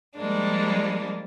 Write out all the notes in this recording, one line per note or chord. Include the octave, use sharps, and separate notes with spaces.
F3 G3 G#3 A#3 D4